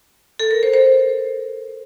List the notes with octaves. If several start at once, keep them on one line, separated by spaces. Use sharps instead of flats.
A4
A#4
C5
C5